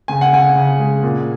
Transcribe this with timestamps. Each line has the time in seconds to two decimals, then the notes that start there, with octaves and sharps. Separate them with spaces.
0.08 C#3 G#5
0.21 F#5
0.33 C#3 G#5
0.55 C#3
0.79 G#3
1.03 A#2